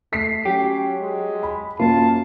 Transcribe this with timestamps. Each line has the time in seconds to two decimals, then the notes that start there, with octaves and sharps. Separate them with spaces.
0.13 A3 B6 C7
0.45 F#3 C#4 G4
1.01 G#3
1.43 B5
1.80 F#2 A#3 F4 A5